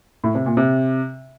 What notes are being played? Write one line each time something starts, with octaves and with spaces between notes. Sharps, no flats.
A2
C3
A#2
C3